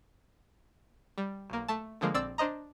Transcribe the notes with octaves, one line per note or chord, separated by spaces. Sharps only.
G3
B1 A#3
A3 A5
D3 F3 G#3 A#3
A#1 C4 D5 E6 A6
D4 C5 D#5 A#5